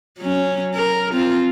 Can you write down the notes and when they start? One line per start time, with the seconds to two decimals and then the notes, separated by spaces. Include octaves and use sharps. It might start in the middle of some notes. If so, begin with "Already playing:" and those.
0.19 F#3 C#4
0.75 A#4
1.13 C4 F4